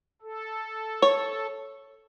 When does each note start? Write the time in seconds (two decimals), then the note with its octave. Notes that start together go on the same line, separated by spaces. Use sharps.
0.22 A4
1.02 C#5